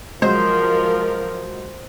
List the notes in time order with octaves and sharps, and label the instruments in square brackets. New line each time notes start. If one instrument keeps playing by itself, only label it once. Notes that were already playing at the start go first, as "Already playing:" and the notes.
[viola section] F3 A#4 [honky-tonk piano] F#3 G#3 [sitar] C5